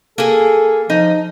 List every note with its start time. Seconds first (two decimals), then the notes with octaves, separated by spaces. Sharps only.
0.18 A#3 G#4 A4
0.90 F3 D#4